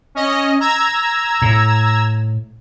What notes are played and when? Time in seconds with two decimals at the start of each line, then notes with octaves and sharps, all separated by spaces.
0.15 C#4 D#5
0.60 A#5 E6 G#6
1.42 A2